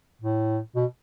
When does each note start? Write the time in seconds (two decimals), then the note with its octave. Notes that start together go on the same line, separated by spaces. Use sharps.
0.21 A2
0.76 B2